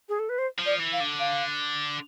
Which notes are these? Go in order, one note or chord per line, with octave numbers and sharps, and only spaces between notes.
G#4
A4
B4
C5
F3
D5
E3
F5
D3
F5